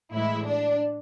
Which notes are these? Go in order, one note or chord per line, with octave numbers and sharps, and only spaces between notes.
A2 E3 G#3 E4
D4